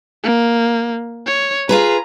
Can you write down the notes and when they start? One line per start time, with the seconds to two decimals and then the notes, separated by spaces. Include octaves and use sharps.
0.24 A#3
1.26 C#5
1.69 F4 G#4 B4 A#5